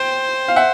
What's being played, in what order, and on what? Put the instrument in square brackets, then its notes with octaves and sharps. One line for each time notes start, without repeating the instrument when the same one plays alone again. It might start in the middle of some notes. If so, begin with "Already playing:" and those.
Already playing: [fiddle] C5 [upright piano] G5
[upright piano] F5
E5 F#5